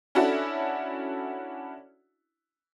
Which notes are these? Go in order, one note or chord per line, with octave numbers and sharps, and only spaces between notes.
C#4 D4 E4 F#4 A4